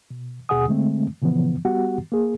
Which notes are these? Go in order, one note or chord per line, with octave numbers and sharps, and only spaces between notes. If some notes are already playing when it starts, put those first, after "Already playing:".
B2
D#2 B2 G#4 F#5 G#5 D#6
D3 G#3 A3 C4
A#2 C#3 E3 F3 B3
G3 B3 F#4 G4 F#5
A#3 G#4